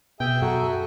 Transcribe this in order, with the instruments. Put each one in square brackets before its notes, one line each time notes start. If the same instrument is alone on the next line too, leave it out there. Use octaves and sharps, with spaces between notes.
[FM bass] B2 [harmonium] G#4 E5 G#5 [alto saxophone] G5
[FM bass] F#2 [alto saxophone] F#4 [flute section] A4 A#5